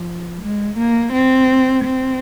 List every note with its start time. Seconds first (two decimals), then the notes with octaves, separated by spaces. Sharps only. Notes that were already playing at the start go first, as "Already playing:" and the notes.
Already playing: F3
0.42 G#3
0.78 A#3
1.13 C4
1.84 C4